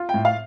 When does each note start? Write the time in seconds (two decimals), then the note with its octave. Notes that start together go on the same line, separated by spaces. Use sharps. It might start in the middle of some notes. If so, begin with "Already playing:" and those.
Already playing: F4
0.09 G5
0.14 A2
0.25 F5